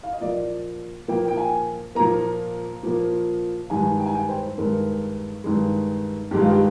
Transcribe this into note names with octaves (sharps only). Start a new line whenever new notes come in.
F5
D#5
A#2 F3 A#3 D5
A#2 F3 A#3 G5
G5
G#5
A#2 F3 A#3 A#5
A#2 F3 A#3
G2 D#3 G#3 G#5
G5
G#5
G5
C5
G2 D#3 G#3 A#4
G2 D#3 G#3
G2 D#3 G#3 G4
F4
G4